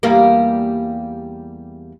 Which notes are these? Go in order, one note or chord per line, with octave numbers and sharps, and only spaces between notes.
E2 G3 A#3